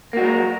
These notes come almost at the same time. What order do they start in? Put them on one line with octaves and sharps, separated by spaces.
A#3 F#4 G#3 A#4 F#3